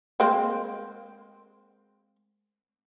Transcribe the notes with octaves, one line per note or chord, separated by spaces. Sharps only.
G#3 A#3 C4